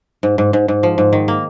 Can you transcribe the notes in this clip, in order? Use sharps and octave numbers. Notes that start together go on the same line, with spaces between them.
G#2
G#2
G#2
G#2
F3
G#2
D#3
A#3